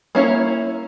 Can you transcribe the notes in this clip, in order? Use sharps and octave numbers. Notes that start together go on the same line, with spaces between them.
A#3 C#4 E4 C#5